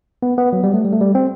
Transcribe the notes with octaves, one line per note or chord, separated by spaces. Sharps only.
B3
B3
F#3
G3
A3
G3
A3
G3
C4